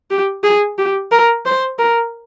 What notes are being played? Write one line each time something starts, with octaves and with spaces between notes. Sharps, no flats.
G4
G#4
G4
A#4
C5
A#4